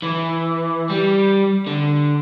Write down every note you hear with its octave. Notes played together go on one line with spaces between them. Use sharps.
E3
G3
D3